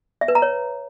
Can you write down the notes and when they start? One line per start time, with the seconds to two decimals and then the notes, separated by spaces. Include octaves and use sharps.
0.21 E5
0.28 B4
0.35 A#5
0.42 C#5